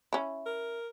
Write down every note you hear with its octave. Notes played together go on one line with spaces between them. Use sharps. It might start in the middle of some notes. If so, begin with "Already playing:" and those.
C#4 E4
A#4